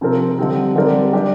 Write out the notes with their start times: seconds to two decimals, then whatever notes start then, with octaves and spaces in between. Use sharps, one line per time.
0.01 C3 F3 C4 A#4
0.39 D3 G3 C4
0.76 D3 G3 C4 A#4 D5
1.13 G3 D4 G4